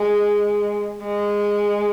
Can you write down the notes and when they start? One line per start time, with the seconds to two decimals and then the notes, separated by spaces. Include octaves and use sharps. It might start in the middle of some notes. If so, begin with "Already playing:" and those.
Already playing: G#3
1.05 G#3